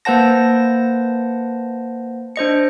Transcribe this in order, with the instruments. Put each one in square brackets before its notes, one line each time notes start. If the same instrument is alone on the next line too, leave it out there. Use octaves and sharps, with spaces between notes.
[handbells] A#3 B4 C5 F#5 A5 A#6
D4 C5 D#5 C#7